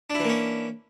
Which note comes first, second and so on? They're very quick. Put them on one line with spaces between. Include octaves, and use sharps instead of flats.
D4 E4 E3 A#3 C#4